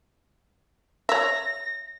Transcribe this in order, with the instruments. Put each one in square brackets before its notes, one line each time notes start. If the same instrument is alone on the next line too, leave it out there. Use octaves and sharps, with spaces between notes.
[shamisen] C#5 E5 [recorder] A#6